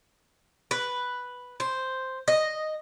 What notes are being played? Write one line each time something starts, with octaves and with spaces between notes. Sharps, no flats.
B4
C5
D#5